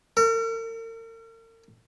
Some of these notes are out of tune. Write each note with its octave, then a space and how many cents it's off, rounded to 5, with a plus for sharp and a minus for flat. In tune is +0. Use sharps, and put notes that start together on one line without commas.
A#4 -45